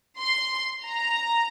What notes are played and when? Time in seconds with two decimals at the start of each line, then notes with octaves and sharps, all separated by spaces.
0.19 C6
0.85 A#5